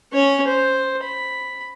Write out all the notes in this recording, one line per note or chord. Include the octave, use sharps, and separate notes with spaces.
C#4 C#5
C5
B5